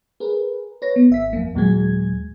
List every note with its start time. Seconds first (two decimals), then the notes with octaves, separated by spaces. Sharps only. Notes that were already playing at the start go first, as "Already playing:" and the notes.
0.20 G#4 A#4 B4
0.82 B4 C#5 A#6
0.96 B3
1.10 G#1 E5 B6
1.33 F2 A#3
1.55 D#2 A#2 F#3 G#3 G#4 G#6